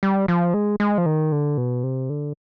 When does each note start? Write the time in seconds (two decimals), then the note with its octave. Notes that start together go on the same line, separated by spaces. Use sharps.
0.03 G3
0.28 F3
0.54 G#3
0.80 G#3
0.98 F3
1.06 D#3
1.32 D3
1.57 B2
1.84 C3
2.10 D3